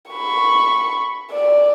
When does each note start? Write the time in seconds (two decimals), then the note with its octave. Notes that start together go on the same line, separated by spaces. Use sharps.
0.11 B5 C#6
1.31 D5